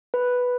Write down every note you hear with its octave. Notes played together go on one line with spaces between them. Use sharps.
B4